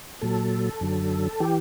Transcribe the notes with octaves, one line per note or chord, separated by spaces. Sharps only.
A#2 F#3 A4
F#2 D3 F#3
E3 G4